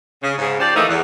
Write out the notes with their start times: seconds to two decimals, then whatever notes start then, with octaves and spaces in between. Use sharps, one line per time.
0.23 C#3
0.38 G#2 C#3
0.59 F3 G4 C5 D5
0.74 D#3 E3 A3 A#3 D#4
0.88 E2